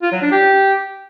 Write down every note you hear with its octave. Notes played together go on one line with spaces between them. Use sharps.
F4
F#3
D4
G4